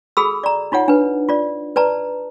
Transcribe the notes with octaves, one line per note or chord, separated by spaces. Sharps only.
F#4 G#4 A4 B5 E6
D5 A#5
D#4 F4 C#5 F#5
D4 B4
F4 D5
B4 D5 A5 A#5